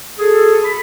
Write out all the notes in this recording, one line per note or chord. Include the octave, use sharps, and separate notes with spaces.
F#4 G#4 A4
B5